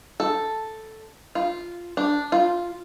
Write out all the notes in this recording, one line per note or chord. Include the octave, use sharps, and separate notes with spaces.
A4
F4
D4
F4